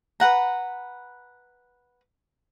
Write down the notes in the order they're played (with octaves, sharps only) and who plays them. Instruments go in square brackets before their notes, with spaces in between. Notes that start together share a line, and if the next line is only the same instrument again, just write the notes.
[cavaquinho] B4 F#5 A#5